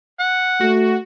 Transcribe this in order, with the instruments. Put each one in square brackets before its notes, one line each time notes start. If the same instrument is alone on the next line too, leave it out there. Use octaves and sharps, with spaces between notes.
[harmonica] F#5
[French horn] A3 [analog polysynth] F#4